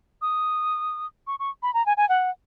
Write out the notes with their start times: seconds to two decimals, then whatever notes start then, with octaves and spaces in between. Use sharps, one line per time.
0.21 D#6
1.27 C#6
1.39 C#6
1.62 B5
1.74 A#5
1.86 G#5
1.97 G#5
2.09 F#5